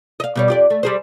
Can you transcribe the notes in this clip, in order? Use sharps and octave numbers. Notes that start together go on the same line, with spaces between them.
D#5 F5
B2 G3 C#5
F2 G4 D5
A3
G3 G#4 C5